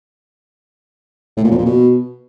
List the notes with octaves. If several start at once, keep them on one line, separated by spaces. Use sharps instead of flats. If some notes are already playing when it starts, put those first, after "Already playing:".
A2
A#2
F2
A#2
B2